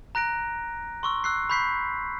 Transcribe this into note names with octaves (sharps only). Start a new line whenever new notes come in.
A#5 F#6 A#6 D7
C6 C#6 E6
E6 F#6 C7
B5 C#6 G6 B6 C7